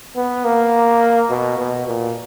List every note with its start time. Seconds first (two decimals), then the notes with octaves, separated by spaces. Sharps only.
0.16 B3
0.45 A#3
1.30 B2
1.58 B2
1.87 A#2